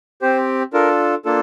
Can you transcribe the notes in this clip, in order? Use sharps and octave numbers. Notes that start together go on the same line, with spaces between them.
C4 G4 C5
D4 F4 A4 A#4
A#3 D4 F4 A4